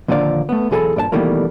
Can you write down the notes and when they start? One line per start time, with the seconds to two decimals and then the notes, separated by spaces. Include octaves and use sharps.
0.08 D#2 A#2 D3 F3 D5 F5
0.49 A3 B3
0.71 B1 E2 G#4 A4 A5 B5
0.96 G2 A#2 D5 A5
1.12 B2 D#3 E3 G3 A3 A#3